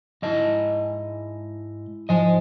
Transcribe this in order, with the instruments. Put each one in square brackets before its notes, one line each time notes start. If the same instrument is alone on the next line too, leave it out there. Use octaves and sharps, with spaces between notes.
[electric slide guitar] G#2 D#5 A5 [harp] G#3 E4
[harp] G#2 F3 [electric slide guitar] D#5 G#5